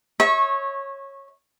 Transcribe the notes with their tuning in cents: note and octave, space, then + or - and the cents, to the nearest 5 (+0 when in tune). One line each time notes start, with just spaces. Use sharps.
C#5 -15 E5 -35 C#6 -25